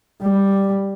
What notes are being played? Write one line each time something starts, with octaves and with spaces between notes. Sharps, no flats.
G3